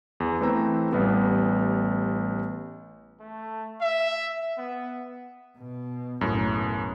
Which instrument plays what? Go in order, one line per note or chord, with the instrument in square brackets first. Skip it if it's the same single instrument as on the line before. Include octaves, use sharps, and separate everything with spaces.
[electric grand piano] E2
E3 A3 C4 C5 A#5 E6
A1 G3 B3 G4
[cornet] A3
E5
B3
[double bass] B2
[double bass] F#1 B1 [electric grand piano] F#2 A2